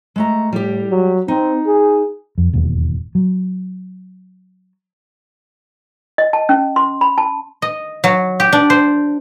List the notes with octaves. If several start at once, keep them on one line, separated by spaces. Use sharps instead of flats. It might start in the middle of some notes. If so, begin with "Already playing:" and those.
G#3 A3 A#5
A2 G3 G4
F#3
C4 D#4
G#4
F2
E1 D#2 G#2
F#3
D#5
A5
C#4
C6
B5
A5
D#5
F#3
G4
D4
C5